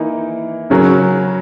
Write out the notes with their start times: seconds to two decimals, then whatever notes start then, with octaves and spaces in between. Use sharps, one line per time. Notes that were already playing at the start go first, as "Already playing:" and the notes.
Already playing: E3 A#3 D#4
0.70 C#3 F#3 C#4 F#4 A#4